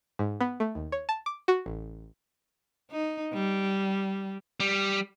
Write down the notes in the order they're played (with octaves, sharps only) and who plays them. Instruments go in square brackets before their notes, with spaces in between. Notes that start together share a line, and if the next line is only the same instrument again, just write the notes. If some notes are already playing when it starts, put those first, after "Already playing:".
[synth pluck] G#2
B3
A3
D#2
C#5
A5
D6
F#4
A1
[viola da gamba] D#4
G3
[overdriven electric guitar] G3